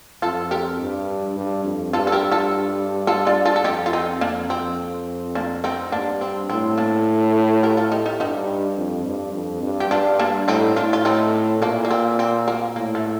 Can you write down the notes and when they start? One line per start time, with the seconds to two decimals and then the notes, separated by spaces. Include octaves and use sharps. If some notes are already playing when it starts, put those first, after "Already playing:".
0.22 F2 F4 A4
0.51 G4 A#4
0.80 G2
1.36 G2
1.65 F2
1.93 G2 F4 A4
2.07 A4
2.12 G4 A#4
2.32 F4 A4
3.07 F4 A4
3.27 D4 F4
3.45 F4 A4
3.56 A4
3.64 F2 D#4 G4
3.86 F4
3.93 C4 D#4
4.21 F2 A#3 D4
4.49 F2 C4
5.35 A#3 D4
5.64 C4 D#4
5.92 G2 A#3 D4
6.21 C4
6.50 A2 C4
6.77 A#3 D4
7.63 G4 A#4
7.77 F4 A4
7.92 D#4 G4
8.06 D#4 G4
8.20 G2 D#4 G4
8.77 F2
9.05 G2
9.34 F2
9.62 G2
9.80 G4
9.91 G2 D4 F4
10.19 A#3 D4
10.48 A2 C4 D#4
10.76 A2 D4 F4
10.93 F4
11.04 A2 C4 D#4
11.61 A#2 A#3 D4
11.85 A#3
11.91 C4
12.19 C4
12.48 A#3
12.76 A2 A#3
12.95 A3